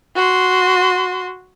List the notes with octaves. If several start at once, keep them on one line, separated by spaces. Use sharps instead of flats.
F#4 C6